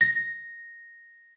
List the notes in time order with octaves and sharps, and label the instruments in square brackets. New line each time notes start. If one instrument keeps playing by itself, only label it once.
[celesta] A#6